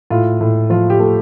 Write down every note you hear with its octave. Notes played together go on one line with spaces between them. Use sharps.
A2 F4
A2
F3 F4
G4
A3